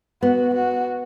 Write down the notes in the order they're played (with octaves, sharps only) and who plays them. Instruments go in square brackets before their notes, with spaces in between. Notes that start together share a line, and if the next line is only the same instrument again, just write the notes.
[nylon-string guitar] B3 [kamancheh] F#4
[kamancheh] F#4